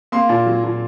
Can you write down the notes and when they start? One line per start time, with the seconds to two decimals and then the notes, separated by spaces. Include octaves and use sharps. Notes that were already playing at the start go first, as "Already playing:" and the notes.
0.12 A#3 C6
0.29 A#2
0.46 F#3
0.64 A#2